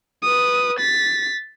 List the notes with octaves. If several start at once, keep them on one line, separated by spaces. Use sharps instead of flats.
B4 D#6
A6 B6